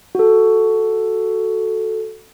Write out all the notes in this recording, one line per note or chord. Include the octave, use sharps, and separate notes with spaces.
F#4 A4